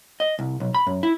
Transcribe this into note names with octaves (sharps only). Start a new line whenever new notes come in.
D#5
C2
B1
B5
F#2
E4